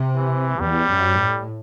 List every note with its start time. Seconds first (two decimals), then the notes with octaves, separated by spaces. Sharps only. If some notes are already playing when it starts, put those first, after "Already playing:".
Already playing: C3
0.16 E3
0.60 E2 G3
0.89 F#2
1.19 A2